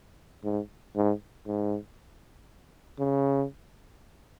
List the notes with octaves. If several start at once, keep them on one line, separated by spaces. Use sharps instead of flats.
G#2
G#2
G#2
C#3